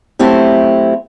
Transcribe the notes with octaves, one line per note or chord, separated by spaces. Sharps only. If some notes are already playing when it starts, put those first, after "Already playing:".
F#3 A3 C4 E4 G4